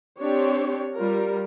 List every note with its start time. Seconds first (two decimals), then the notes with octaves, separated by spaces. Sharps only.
0.20 C4 D4 G4 C#5
0.94 G3 F4 A#4